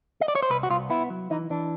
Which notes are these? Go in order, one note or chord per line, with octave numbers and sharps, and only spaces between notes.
D#5
D5
C#5
C5
C2 B4
F#4
C2 F4
B3 E4
F#3
E3 D#4
E3 D4